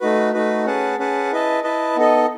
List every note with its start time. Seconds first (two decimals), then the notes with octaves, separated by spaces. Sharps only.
0.01 A3 D#4 F#4 B4
0.33 A3 D#4 F#4 B4
0.66 C#4 G#4 B4 F#5 A5
0.99 C#4 G#4 B4 F#5 A5
1.32 E4 B4 D#5 A5
1.64 E4 B4 D#5 A5
1.96 B3 D#4 A4 D#5